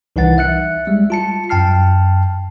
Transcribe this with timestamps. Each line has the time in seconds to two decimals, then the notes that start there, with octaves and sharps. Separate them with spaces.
0.16 C2 E3 D#4 F#5 A6
0.38 E5 F#6 C#7
0.87 G3 G#3
1.10 F4 A5 C#7
1.49 F#2 G5 A5 F6 C7